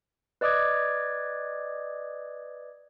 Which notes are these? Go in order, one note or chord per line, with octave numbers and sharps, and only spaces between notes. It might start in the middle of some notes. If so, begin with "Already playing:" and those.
B4 D5 D#5 D6 D#6 G#6